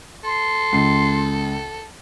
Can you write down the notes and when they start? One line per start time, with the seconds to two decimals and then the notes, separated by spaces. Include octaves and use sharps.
0.24 A4 C6
0.72 C#2 C7